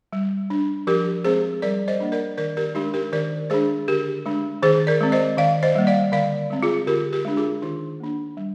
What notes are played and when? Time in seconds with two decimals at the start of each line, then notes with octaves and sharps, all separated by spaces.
0.13 G3
0.50 D4
0.87 F3 G4 A#4
1.25 G#3 C4 G#4 C5
1.62 G3 A#4 D5
1.88 C5 D#5
2.00 A#3 D4
2.12 A#4 D5
2.37 D#3 A#4 D5
2.57 G4 A#4
2.75 G#3 D4 D#4 G4
2.94 G4 A#4
3.12 D#3 A#4 D5
3.50 G#3 D4 G#4 C5
3.88 D3 G4 A#4
4.26 G#3 D4
4.63 D#3 G#4 C5
4.87 A#4 D5
5.01 G#3 C4
5.12 C5 D#5
5.37 D#3 D5 F5
5.63 C5 D#5
5.75 G3 A#3
5.87 D5 F5
6.12 D3 D5 F5
6.50 G#3 C4
6.63 F4 G#4
6.87 D3 G4 A#4
7.13 G4 A#4
7.25 G#3 D4
7.37 F4 G#4
7.62 D#3 D#4
8.00 A#3 D4
8.37 G3